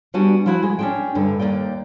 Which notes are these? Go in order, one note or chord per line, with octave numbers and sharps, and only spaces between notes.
G3 B3 D4 F#4 G#5
F3 E4 F#4
G#3
C#4 D4 G5
D2 G2 D3
D#2 D#3 A#3 D5 G5